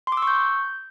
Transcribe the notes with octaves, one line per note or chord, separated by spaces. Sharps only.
C6
D6
E6
C#6
G6